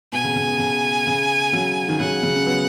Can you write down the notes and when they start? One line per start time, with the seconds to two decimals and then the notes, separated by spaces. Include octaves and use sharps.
0.13 B2 G#5
0.24 C#3
0.36 C#3
0.48 B2
0.59 C#3
1.07 C#3
1.53 C#3 F#3
1.88 D#3
2.00 C#3 F#3 F#5
2.23 C#3 F#3
2.36 C#4
2.46 F#3 B3